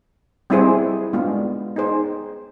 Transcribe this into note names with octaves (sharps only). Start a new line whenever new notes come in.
G3 C4 E4 G#4 C5
G#3 B3 D4 F4
D#4 G#4 C5